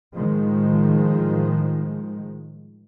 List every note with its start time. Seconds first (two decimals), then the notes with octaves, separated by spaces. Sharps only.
0.16 A2 D#3 F3 G#3